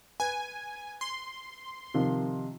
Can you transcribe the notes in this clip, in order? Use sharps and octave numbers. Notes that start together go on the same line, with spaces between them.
B4 G#5
C6
C3 D#3 F3